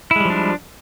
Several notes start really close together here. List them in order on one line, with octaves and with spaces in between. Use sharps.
E4 G#3 G3 F3 D4